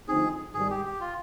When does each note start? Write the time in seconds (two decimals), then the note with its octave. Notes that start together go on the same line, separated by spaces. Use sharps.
0.08 D2 D3 F3 C4 D#4 G#4
0.54 G#1 G#2 G3 G#4
0.70 G4
0.85 G4
1.00 F4